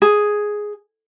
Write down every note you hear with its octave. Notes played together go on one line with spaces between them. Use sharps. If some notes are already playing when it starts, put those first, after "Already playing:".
G#4